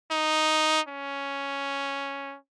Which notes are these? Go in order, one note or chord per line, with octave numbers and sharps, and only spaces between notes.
D#4
C#4